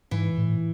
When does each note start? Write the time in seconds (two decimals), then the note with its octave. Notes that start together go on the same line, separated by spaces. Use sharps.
0.11 G#2 E3
0.38 A2